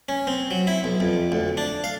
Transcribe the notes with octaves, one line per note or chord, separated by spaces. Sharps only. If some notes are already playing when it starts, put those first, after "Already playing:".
C#4
C4
F#3
E4
B1
F2
D2
D4
F5